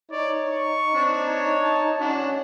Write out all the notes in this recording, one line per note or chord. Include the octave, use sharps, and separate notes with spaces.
D#4 C#5 D5
C#6
C4 D4
C#5
A5
C#4 D4 F#4